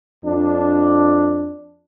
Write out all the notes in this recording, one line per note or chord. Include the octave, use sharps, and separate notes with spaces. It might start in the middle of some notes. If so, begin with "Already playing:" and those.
F2 D4